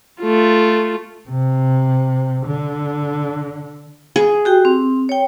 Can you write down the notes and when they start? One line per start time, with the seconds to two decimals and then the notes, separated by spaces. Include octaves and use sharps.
0.23 A3 F4
1.29 C3
2.47 D3
4.16 G#4
4.45 F#4 G4 G5
4.65 C4
5.09 C#5 G5